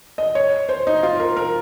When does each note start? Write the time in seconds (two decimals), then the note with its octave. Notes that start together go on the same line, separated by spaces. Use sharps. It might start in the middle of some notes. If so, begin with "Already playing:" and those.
0.18 D#5
0.35 C#5
0.69 C5
0.87 D#4
1.03 F4
1.19 A#4
1.36 A#4